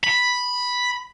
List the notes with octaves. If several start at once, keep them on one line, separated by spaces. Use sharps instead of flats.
B5